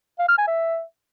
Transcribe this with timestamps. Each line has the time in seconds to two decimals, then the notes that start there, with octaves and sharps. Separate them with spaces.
0.19 F5
0.28 F6
0.38 G#5
0.47 E5